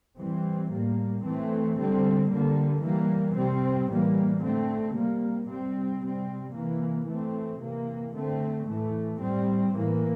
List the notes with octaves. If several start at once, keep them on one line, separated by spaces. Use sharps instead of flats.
E3 G3 C4
A2 G3 A#3
E3 A3 C4
D3 G3 C4
D3 G3 A#3
E3 G3 A#3
C3 G3 C4
A2 E3 G3 A#3
D3 A3 C4
C3 G3 A#3
C3 G3 C4
C3 G3 C4
C3 E3 A#3
E3 A3 C4
C3 E3 A#3
D3 A3 C4
A2 E3 A3
A2 G3 C4
A2 E3 A#3